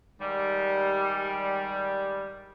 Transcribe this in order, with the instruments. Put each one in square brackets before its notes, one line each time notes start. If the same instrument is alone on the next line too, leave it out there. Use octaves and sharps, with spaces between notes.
[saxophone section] G#2 D#3 G3